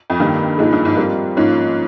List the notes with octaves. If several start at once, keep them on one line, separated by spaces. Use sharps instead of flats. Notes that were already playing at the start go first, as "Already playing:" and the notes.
F2
G2 D#3 A#3 D#4 G4
G#2 F3 A#3 D#4 G#4
G2
G#2
G3 C4 F4 A#4
G#2 F3 A#3 C#4 F4